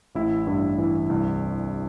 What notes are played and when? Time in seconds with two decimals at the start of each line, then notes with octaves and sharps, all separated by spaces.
0.15 A1 E4
0.47 G2
0.78 E3
1.10 C2